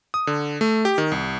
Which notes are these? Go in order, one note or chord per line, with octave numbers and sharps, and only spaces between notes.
D#6
D3
A3
G4
D#3
C2